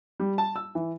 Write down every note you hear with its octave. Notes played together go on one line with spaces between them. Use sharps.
G3
A5
E6
E3